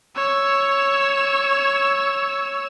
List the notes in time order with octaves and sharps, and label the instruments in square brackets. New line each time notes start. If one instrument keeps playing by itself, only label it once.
[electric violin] C#5 E6